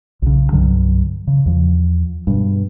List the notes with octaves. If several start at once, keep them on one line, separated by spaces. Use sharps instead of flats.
B1 C#3
C2 G2 D3 F#3
C#3
E2 F3
G2 B2